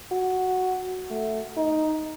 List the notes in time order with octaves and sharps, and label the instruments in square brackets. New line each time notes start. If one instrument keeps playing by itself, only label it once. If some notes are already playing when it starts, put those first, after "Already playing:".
[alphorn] F#4
A3
D#4